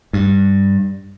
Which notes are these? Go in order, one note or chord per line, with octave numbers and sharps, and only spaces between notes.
G2